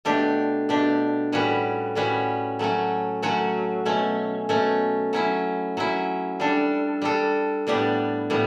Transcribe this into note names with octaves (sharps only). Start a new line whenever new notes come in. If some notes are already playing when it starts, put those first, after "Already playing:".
B2 A3 D4 G4
B2 A3 D4 G4
A2 G3 C#4 F#4 B4
A2 G3 C#4 F#4 B4
F#3 A3 C#4 F#4
F#3 A3 C#4 F#4
B2 A3 C#4
B2 A3 C#4
F#3 C#4 E4
F#3 C#4 E4
G3 D4 A4
G3 D4 A4
A2 G3 B3 D4 G4
A2 G3 B3